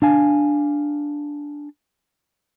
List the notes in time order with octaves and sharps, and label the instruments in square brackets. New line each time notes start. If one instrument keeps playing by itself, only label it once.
[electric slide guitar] D4 F5 G#5